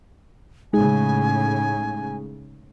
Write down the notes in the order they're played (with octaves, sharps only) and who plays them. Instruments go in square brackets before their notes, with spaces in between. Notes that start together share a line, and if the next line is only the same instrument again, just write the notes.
[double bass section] A2 C#3 [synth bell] G#3 D#4 G#4 [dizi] G#5